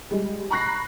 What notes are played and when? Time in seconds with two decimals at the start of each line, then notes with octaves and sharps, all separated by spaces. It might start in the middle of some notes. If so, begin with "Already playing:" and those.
0.11 G3 G#3
0.50 A#5 B5 C#6 F#6 A#6 C7